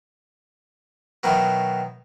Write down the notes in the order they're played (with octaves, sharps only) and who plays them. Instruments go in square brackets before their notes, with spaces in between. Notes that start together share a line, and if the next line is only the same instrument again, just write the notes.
[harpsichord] B2 D#3 F#3 E4